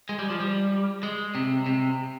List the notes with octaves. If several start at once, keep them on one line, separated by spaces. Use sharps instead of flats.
G#3
G3
F3
G3
G#3
C3
C3